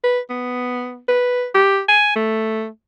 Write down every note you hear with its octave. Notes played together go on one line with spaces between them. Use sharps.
B4
B3
B4
G4
G#5
A3